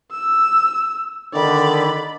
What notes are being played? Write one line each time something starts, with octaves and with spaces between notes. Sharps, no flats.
E6
D3 D#3 D5 B5